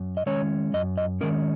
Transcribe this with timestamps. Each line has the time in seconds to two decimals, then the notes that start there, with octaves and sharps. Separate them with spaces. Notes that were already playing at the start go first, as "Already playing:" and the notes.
Already playing: F#2
0.17 D#5
0.26 D#3 G#3 C#4 C#5
0.74 F#2 D#5
0.97 D#5
1.21 D#3 G#3 C#4 A#4